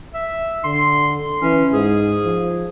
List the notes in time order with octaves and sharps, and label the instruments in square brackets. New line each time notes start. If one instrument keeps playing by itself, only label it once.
[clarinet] E5
[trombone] D3 [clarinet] C6
[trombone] E3 [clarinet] C#4
[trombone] G#2 [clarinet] G#4
[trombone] F3